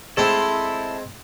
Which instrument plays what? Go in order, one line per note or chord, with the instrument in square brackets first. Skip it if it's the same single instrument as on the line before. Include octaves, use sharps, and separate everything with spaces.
[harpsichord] G#3 C4 [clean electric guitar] E4 A4